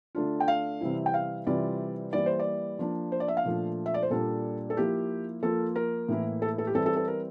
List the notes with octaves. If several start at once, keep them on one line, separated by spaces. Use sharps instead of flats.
D3 A3 D4 F4
G5
F5
C3 E3 G3 C4 E4
G5
F5
C3 E3 G3 C4 F4 D5
E3 G3 A#3 D5
C5
D5
F3 A#3 D4
C5
D5
E5
F5
A#2 F3 A3 D4 F4
E5
D5
C5
A#2 G3 D4 F4 A4
A4
F3 A#3 E4 G4
F3 A#3 F4 A4
A#4
A2 E3 A#3 E4
A4
A4
G4
E3 G3 C4 A4
A4
A4
A#4